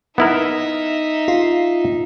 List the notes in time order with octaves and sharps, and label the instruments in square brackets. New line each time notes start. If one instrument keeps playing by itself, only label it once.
[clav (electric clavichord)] B3 E4 A#4 [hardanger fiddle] D#4 E5
[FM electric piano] F4